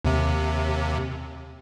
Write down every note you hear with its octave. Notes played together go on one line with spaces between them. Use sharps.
D#2 C3